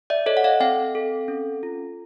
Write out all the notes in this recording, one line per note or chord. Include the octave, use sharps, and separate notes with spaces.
D5 E5
A4 C#5 D#5
F#5
D#5 F5
C4 F5 G5
A4
C#4
F4